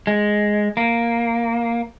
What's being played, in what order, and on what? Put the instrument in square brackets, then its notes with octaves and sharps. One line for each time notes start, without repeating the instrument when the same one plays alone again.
[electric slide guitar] G#3
A#3